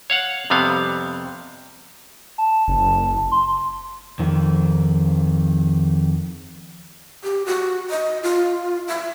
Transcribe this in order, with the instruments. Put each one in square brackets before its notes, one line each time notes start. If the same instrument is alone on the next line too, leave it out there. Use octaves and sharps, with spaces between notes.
[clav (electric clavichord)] C#5 F5 F#5
F2 C3 G3 B3 F5
[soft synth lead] A5
[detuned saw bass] F#1
[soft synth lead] C6
[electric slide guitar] F2 D#3
[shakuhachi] G4
F#4
D#5
F4
E5